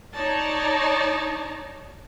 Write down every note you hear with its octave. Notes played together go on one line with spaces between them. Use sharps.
D#4 C#5 D5 A5 A#5